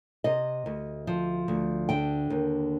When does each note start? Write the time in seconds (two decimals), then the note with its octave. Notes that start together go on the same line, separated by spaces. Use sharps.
0.24 C3 D#5
0.66 D2
1.07 F3
1.48 D2
1.89 D3 G5
2.30 D#2